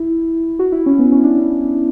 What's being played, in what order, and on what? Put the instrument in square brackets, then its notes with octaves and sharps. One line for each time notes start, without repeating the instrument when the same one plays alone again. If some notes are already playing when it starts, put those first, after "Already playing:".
Already playing: [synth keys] E4
F#4
E4
C#4
B3
C#4
D4
C#4